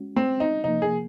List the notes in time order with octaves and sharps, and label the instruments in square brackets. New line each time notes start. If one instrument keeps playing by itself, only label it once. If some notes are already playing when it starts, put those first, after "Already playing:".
Already playing: [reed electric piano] G#3 C#4 F#4
[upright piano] C4
D#4
[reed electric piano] C3 F3 A#3 [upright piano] D#4
[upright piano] G#4